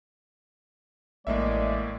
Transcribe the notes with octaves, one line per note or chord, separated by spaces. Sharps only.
A1 A2 G#3 A#3 D5 E5